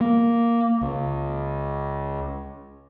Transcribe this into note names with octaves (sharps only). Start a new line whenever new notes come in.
A#3
C#2